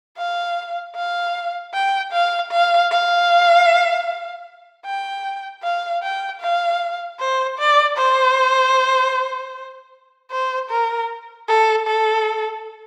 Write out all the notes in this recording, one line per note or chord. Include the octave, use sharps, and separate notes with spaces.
F5
F5
G5
F5
F5
F5
G5
F5
G5
F5
C5
D5
C5
C5
A#4
A4
A4